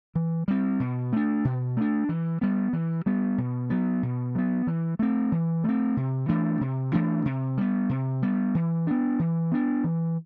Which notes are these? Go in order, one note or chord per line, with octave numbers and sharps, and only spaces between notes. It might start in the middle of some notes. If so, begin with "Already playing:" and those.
E3
G3 C4
B2
A3 D4
B2
A3 D4
E3
G3 B3
E3
G3 B3
B2
F#3 B3
B2
F#3 B3
E3
A3 C4
E3
A3 C4
C3
E3 A3 D4
C3
E3 A3 D4
C3
G3 B3
C3
G3 B3
E3
B3 D4
E3
B3 D4
E3